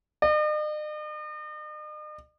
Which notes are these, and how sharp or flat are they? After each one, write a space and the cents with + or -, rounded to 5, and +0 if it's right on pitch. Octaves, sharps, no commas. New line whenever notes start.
D#5 -45